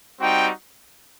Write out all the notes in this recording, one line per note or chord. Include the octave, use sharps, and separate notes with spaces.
G3 C4 D#4 F#4 G5